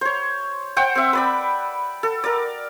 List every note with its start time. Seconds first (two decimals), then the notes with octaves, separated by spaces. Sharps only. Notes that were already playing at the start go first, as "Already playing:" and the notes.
0.01 C5 C#5
0.77 C5 F#5 G5
0.95 C4 E5
1.13 B4 D5 B5
2.03 A4
2.24 A#4 D5